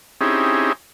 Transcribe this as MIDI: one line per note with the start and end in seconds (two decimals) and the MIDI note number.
0.21 0.73 60
0.21 0.73 61
0.21 0.73 63
0.21 0.73 64
0.21 0.73 67
0.21 0.73 68